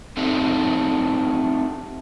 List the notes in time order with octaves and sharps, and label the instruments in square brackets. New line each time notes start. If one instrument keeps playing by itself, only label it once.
[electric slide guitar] A3 C4 D4 D#4 G4